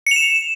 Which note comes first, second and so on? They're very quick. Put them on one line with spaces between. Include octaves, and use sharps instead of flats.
C#7 F7 E7